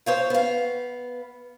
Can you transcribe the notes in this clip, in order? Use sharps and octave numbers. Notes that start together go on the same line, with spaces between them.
C5 C#5 F5
B3 F5